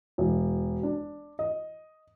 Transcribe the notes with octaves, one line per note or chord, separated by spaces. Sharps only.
E1
D4
D#5